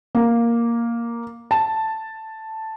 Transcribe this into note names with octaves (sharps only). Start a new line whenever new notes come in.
A#3
A5